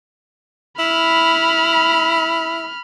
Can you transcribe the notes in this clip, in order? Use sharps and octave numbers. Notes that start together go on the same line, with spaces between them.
E4 B5 F6